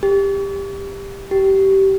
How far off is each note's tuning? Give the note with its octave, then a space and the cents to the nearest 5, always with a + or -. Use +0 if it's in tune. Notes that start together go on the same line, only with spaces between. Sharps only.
G4 +15
G4 -20